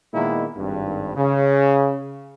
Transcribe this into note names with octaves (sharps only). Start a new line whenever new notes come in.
A#2 D#3 G#3 A#3 B3 E4
G#1 G2
C#3